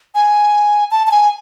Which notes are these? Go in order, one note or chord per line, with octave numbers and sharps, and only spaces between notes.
G#5
A5
A5
G#5